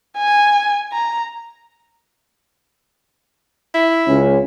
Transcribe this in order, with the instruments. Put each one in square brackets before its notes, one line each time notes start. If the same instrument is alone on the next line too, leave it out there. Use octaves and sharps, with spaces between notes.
[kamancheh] G#5
A#5
[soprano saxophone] E4
[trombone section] C#2 C#4